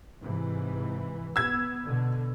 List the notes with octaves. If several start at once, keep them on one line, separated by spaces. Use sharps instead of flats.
G#2 C3 E3
B3 E6 G#6
B2 D3